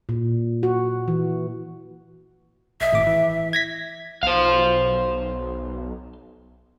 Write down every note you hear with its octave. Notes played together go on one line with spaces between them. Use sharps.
A#2
F#4
E3
B1 D#5 E5
G#1 A2 D6
E3
G#6 A#6 B6
B1 C5 F5